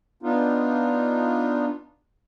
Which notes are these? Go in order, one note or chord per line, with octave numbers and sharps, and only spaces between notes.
B3 D4 D#4 F4